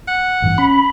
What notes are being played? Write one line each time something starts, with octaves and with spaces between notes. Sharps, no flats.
F#5
A1 G2 E3
C#4 B5